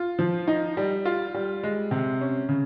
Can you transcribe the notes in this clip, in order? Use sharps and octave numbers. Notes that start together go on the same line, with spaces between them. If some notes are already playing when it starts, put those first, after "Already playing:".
Already playing: F4
F3
D#4
G3
F4
G3
G#3
C3
C#4
C#3